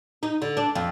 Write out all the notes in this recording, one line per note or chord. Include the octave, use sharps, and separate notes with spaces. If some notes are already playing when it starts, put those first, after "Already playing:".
D#4
D3
D4
F2